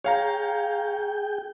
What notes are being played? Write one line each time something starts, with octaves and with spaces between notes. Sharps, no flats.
G#4 C#5 F5 G5 A#5